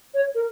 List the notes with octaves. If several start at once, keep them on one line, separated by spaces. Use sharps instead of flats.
C#5
A#4